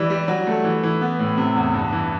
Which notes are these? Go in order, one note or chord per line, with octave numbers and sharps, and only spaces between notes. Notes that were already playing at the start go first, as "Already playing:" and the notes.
Already playing: E3 G3
G3
F#3
A3
E3
E3
B3
A2
C3
E2
G2
E3